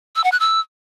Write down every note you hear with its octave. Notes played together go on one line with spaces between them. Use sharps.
E6
F#5
F#6
E6